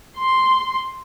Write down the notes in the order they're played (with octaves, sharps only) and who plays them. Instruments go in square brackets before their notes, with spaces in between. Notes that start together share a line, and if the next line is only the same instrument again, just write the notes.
[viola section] C6